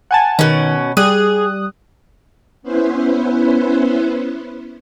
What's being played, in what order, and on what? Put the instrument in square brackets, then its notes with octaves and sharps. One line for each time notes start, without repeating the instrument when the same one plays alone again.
[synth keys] F#5 G#5 A5
[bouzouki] B2 C#4 [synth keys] D#3
[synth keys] G3 D#6 F#6 [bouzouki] G#4
[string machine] B3 C#4 E4 B4 C5